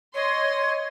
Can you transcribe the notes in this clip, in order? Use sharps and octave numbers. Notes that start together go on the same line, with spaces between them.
C#5 D#5 C6